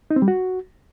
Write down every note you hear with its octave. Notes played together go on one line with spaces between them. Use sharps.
D#4
C4
G3
F#4